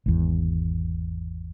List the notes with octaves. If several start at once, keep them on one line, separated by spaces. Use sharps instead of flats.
G#1 E2